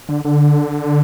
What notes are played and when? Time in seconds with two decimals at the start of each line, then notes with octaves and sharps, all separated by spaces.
0.09 D3
0.25 D3